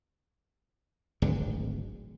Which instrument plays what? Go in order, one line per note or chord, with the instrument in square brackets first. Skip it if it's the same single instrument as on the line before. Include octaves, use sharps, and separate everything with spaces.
[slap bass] D1 G#1 D2 D3